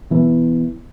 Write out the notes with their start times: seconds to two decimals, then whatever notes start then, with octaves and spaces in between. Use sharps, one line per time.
0.10 B2 E3 B3